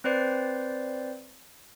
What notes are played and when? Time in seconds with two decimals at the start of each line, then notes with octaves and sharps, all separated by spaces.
0.04 C4 B4 C5 D5 C7